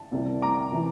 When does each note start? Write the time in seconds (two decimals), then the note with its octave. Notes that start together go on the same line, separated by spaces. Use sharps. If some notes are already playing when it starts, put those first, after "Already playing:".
Already playing: A5
0.11 C2 C3 G3 A#3
0.42 A#5 D6
0.72 C3 E3